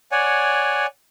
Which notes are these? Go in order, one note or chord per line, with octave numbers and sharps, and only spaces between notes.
C#5 D5 F#5 G#5